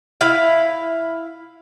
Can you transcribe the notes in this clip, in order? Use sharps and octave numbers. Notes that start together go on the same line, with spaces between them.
E4 F5